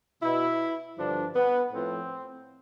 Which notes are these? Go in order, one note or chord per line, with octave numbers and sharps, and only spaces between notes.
B2 E4
G2 D3 F3 D4
B3
A2 F3 C4